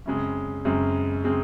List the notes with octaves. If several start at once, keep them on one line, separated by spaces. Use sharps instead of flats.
F#2 C#3 G#3 C4
F#2 C#3 G#3 C4
C#3 G#3 C4